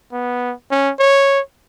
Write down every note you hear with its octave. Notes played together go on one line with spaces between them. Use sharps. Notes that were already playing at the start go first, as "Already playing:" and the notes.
B3
C#4
C#5